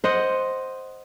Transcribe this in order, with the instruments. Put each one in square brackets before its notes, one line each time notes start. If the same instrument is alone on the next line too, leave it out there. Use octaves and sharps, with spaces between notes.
[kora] C5 D#5 F#5